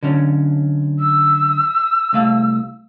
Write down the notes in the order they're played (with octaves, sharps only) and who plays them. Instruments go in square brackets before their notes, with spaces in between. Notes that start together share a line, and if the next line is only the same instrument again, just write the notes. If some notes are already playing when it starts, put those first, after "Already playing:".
[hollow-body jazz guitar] D3 F#3 C#4
[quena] E6
[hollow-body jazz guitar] C2 A3 F5